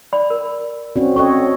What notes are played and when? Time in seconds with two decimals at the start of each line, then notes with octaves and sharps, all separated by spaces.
0.13 D5 B5
0.30 A#4
0.96 C4 C#4 F#4 D5
1.16 C#4 A4 C#5 D#5 C#6